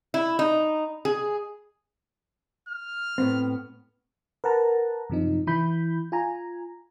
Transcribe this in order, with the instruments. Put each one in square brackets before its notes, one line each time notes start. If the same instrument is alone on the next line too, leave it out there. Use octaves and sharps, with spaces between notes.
[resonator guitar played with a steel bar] E4
D#4
G#4
[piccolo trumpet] F6
[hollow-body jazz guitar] A2 B3 C4
[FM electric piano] A#4 B4 F#5 A5 A#5
F#2 C3 F3 D#4
E3 E4 B5 G6
F4 G#5 A#5